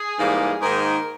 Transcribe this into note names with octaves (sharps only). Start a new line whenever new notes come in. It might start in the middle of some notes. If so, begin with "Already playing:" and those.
Already playing: G#4
G#2 E3 G3 A#3
G#2 D#3 A#3 A#4